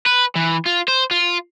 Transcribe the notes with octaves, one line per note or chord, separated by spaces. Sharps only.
B4
E3
F4
C5
F4